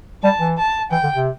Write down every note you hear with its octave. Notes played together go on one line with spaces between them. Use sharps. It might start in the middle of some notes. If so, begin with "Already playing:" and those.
G3 A5
E3
A5
E3 G5
D3
C3